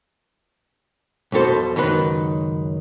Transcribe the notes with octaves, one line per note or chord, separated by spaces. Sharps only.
B1 F2 B2 A4 C5
C#2 F#2 D#3 B4